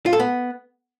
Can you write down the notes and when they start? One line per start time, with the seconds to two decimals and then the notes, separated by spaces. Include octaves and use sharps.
0.06 F4
0.13 A4
0.20 B3